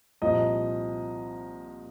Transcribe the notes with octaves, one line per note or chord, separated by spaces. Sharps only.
C2 A#2 F3 D#5